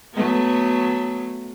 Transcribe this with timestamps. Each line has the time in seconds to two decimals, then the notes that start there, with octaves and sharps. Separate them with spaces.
0.14 F#3 A3 B3